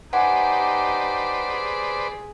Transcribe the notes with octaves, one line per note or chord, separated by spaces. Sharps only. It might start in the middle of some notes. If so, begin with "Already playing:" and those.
D#4 G4 B4 C5 D5 F#5 G#5
G#4